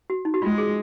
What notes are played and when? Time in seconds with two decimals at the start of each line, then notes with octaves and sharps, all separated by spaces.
0.10 F#4
0.25 D#4
0.34 F#4
0.42 G#3 F4
0.58 G#4